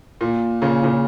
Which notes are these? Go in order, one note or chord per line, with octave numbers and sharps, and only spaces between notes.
A#2
A#2 C#3
A#2 C#3